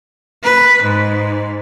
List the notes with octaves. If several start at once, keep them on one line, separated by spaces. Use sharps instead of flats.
B4
G#2